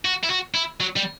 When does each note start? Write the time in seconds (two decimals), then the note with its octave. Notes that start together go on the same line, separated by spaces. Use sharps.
0.05 F#4
0.24 E4
0.30 F#4
0.54 E4
0.80 F#3
0.96 G3